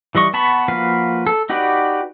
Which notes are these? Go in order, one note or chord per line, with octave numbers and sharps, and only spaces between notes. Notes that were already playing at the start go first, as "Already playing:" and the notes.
E3 G3 D#5 C#6
B3 A5 B5 C#6
F3 A#3 F#4 B4 F5
A4
D#4 F#4 G4 B4 D5